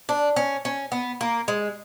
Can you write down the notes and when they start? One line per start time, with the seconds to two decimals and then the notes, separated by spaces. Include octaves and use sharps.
0.09 D4
0.36 C#4
0.65 C#4
0.92 B3
1.21 A#3
1.48 G#3